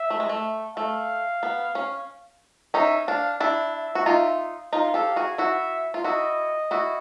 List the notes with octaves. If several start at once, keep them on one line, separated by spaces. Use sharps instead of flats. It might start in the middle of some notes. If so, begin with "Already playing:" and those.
Already playing: E5
A3
G#3
A3
A3 F5
B3
C#4
C#4 D#4 E5
D4 F5
D4 E4
E5
F#4
D#4 F4
D#4 F4 F5
G4 A4
F#4 G#4
E4 F#4 E5
F4
E4 F#4 D#5
E4 F#4